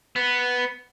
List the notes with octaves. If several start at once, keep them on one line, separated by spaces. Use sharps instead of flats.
B3